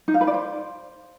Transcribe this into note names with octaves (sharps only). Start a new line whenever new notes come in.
D#4
F5
B4
D5
C5